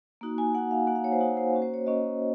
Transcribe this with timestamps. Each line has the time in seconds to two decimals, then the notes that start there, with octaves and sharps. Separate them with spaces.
0.21 A#3 D#4 F#4
0.38 G#5
0.55 A#3 D#4 F#4 F#5
0.71 F5
0.87 A#3 D#4 F#4 F#5
0.96 F5
1.04 C#5
1.12 C5
1.20 A#3 D#4 F#4
1.37 C5
1.53 A#3 C#4 F#4
1.62 C5
1.74 C#5
1.86 A#3 C#4 F#4 D#5